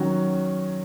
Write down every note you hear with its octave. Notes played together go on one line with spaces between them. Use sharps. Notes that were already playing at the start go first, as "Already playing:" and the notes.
Already playing: D#3 F#3 C#4 F#4